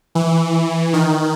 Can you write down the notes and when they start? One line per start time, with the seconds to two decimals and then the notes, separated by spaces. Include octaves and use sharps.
0.15 E3
0.93 D#3